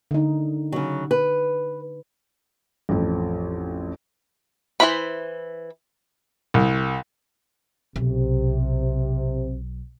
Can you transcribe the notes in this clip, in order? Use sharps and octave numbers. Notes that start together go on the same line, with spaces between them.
D3 D#4
C#3 F#3
B4
A1 F2
E3 C4 E4 C5 B5
C2
B1 C3